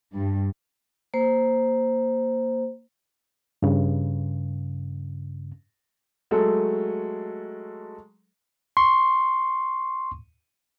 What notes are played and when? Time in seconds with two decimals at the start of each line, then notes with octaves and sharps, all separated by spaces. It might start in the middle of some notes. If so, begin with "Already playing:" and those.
0.14 G2
1.14 A#3 C5
3.62 G2 C#3
6.31 F#3 G#3 A3 A4
8.77 C6 C#6